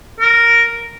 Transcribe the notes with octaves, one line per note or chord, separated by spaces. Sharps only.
A#4